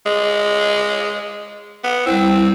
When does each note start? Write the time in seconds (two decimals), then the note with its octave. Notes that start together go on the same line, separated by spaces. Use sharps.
0.06 G#3
1.84 B3
2.06 G3 C4 E4